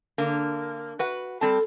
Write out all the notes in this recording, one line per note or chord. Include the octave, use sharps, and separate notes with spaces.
D3 A#3
F#4 B4 F#5
G3 C4 A4 A5